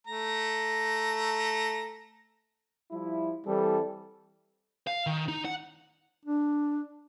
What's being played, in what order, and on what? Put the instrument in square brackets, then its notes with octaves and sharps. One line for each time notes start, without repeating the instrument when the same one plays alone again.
[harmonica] A3 A#5
[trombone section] F3 G3 E4
[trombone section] E3 C4 A4 [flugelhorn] G3
[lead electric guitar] F5
D#3
D#4
F#5
[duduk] D4